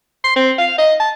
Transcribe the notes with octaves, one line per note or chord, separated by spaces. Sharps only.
C6
C4
F5
D#5
A5